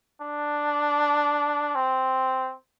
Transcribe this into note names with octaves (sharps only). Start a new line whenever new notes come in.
D4
C4